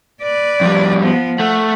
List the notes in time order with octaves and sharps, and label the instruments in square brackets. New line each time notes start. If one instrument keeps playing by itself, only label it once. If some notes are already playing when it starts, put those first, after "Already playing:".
[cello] B4 D5
[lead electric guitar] F2 G3
[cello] F3 B3
[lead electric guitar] A3 [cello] F#5